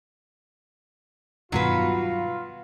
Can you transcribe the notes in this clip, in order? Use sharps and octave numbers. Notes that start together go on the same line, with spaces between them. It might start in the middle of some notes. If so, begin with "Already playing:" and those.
G2 B2 D#3 F#3 F4 F#4 B4